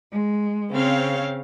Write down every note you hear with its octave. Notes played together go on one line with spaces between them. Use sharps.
G#3
C#3 C4 C#5 F5